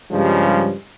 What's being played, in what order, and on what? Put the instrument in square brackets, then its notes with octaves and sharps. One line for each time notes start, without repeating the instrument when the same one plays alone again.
[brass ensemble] G2 C#3 F3 G3 G#3